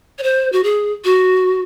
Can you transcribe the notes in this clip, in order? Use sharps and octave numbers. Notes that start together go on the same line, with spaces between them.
C#5
C5
F#4
G#4
F#4